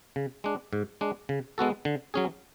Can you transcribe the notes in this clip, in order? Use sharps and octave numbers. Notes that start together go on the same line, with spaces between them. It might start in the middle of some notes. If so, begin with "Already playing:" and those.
C#3
G#3 D4
G#2
G#3 D4
C#3
G#3 B3 F#4 A4
D3
F#3 C#4 G#4